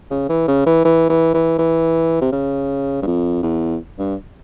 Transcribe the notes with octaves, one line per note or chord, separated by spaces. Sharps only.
C#3
E3
C#3
E3
E3
E3
E3
E3
C3
C#3
G2
F2
E2
G2